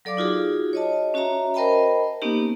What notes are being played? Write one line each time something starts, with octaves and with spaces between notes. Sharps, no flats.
F#3 A4 D5 F5 D6
D#4 F4 F#4 G#4
C#5 D#5 A5
C#4 F#4 C#5 E5 A#5
A#4 C5 D#5 G5 A5 B5
A#3 B3 C#4 D#4 G4